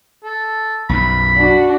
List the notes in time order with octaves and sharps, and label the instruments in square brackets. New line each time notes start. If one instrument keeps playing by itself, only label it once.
[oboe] A4
[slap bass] B1 F#2 [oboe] B5
[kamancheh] D4 F#4